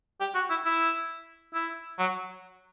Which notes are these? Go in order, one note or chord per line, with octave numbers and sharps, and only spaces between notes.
G4
F#4
E4
E4
E4
F#3